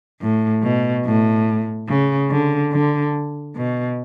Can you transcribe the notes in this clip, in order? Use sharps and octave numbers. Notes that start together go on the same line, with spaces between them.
A2
B2
A2
C#3
D3
D3
B2